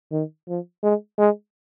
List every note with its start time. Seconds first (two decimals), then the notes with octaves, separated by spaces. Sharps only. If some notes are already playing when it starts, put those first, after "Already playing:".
0.12 D#3
0.48 F3
0.83 G#3
1.18 G#3